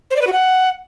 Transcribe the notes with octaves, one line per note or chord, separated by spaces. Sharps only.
C5
D5
B4
F#4
F#5